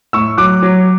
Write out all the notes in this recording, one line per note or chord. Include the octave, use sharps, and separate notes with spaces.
A2 C#6 E6
F#3 D6 F#6
F#3